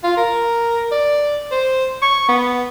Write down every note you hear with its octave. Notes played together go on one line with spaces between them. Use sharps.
F4
A#4
D5
C5
C#6
B3